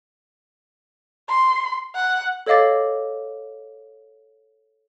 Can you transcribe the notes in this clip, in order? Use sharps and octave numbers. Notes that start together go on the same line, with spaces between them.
C6
F#5
A4 C#5 D#5 F5 D6 A6